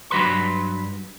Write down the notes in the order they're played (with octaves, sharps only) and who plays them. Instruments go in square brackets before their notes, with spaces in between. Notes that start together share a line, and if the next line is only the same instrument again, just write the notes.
[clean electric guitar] G2 F#3 B4 C6